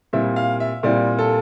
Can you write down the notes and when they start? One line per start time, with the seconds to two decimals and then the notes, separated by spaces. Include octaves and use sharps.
0.13 A#2 G3 C4 E4 E5
0.36 F5
0.60 E5
0.83 A#2 G3 C4 E4 D5
1.19 A4